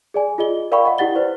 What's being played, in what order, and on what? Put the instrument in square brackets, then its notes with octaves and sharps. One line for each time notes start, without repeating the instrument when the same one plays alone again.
[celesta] G#4 D5 G#5
F4 G#4 D#5 G7
A#4 D5 F5 G5 B5 C#6
D#5 F#5
E4 G4 F#5 A6 G7
B4 C5 D5